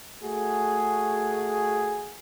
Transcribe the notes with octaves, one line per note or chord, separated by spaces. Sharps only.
A3 F#4 G#4